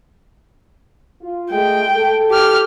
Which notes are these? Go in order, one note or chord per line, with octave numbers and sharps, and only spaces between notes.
F4
G#3 A3 G5
A4
G4 F6